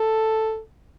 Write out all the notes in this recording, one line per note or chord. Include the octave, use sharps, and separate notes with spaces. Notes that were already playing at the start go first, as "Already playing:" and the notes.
Already playing: A4